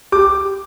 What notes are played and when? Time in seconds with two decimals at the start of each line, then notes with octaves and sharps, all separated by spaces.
0.12 G4 D6